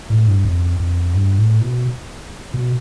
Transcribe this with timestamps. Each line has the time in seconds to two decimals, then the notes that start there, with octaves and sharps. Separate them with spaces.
0.10 A2
0.28 G2
0.45 F2
0.80 F2
1.15 G2
1.38 A2
1.61 B2
2.54 B2